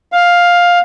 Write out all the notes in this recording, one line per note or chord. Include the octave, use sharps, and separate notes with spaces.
F5